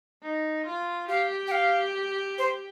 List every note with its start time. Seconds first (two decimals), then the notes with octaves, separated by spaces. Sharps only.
0.22 D#4
0.66 F4
1.08 G4 F5
1.48 G5
1.51 F5
2.38 C5